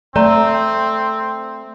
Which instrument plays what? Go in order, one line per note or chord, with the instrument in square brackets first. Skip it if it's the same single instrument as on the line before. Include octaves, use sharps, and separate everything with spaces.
[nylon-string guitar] A3 [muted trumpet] C4 [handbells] D5 A#5